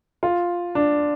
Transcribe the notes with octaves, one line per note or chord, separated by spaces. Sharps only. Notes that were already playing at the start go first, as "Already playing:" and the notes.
F4
D4